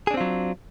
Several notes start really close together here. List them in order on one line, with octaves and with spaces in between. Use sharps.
G#4 D4 C4 F4 F#3